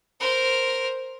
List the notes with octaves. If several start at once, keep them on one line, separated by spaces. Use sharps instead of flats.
A#4 C5